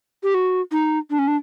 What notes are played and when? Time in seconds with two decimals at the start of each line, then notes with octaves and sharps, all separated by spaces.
0.23 G4
0.34 F#4
0.72 D#4
1.10 D4
1.19 C#4
1.28 D4